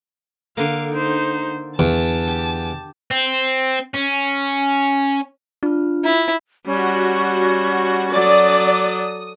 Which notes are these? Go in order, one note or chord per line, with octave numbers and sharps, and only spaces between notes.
D3 A#3 F5
D#4 C5
E2 A5
G4
C4
C#4
D4 F4 F6
E4
G3 C#4 F#4
F#3 A4 D5 D#6